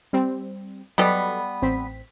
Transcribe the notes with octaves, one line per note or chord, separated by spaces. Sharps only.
G3 C4
F#3 G3 B3 A4 D#5
A1 C4 B6